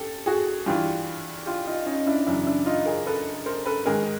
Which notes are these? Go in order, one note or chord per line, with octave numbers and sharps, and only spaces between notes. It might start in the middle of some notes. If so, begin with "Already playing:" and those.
Already playing: G4 A4
F#4 G#4
G2 E3 F4 G4
F4 G4
D#4 F4
C#4 D#4
D4 E4
F#2 C#3 E3 D4 E4
D4 E4
D#4 F4
G#4 A#4
A4 B4
A#4 C5
A4 B4
G#2 D#3 G#4 A#4